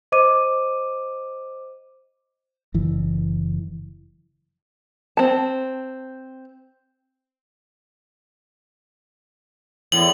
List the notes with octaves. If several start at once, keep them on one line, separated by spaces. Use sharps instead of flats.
C5 D#5 D6 D#7
F#1 E3
C4 A5
E2 A2 F#7